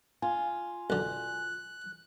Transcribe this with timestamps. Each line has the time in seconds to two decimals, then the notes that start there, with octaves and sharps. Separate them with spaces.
0.22 F4 G#5
0.90 B1 D3 F#6